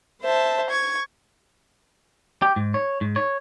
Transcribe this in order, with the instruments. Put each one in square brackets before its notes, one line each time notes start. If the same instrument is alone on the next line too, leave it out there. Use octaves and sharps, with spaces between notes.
[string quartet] C5 E5 A5
C#6 G#6
[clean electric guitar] G4
G#2
C#5
G#2
C#5